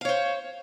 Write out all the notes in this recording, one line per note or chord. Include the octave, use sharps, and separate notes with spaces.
C5 C#5 F5